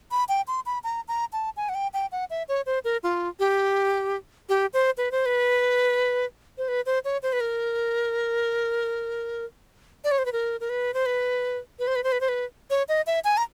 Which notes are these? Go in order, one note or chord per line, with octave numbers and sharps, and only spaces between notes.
B5
G5
C6
B5
A#5
A#5
A5
G#5
F#5
G5
G5
F#5
E5
C#5
C5
A#4
F4
G4
G4
C5
B4
C5
B4
C5
B4
C5
C#5
C5
B4
A#4
D5
C#5
C5
B4
A#4
A#4
B4
C5
B4
B4
C5
B4
C5
B4
C5
B4
C#5
D#5
E5
G#5
A#5